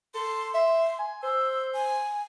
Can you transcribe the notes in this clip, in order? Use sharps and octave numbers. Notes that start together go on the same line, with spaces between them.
A4 C6
E5 C6
G#5
C5 E6
G#5